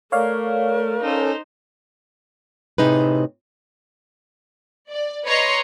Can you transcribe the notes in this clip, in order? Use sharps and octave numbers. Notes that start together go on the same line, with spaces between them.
A3 A#4 C#5 D5 F5
C#4 D#4 A4 C5
A2 C3 D#4 G#4 B4
D5
B4 C#5 D#5 A#5 C6